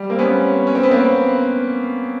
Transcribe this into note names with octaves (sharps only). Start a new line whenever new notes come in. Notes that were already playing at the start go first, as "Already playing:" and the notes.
Already playing: G3
A#3 C4
B3 C#4
C#4
C4
B3
A#3 C4